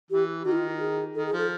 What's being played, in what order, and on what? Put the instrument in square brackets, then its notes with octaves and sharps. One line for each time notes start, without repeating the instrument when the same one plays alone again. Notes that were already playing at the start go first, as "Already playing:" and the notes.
[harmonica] E3 [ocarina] G4
[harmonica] D#3 [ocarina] F#4
[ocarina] E4
F4
G#4
[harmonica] D#3 [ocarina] A4
[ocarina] G#4
[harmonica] F3
[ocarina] A4